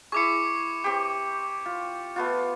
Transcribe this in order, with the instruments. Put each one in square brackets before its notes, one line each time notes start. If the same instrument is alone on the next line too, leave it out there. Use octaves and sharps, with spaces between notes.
[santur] E4 G#4 [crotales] C#6 D6 C#7
[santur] C4 G4
F4
A3 B3 F4